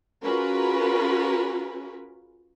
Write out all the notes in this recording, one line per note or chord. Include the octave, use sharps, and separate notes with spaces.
C#4 F4 F#4 G#4 A#4 B4